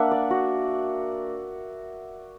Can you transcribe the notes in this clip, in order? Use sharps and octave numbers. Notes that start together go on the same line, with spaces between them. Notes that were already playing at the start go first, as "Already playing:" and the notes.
Already playing: A#3 D4 E5 F#5
D5
F#4